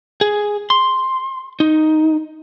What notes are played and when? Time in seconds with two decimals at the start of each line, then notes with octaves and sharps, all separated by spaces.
0.21 G#4
0.70 C6
1.60 D#4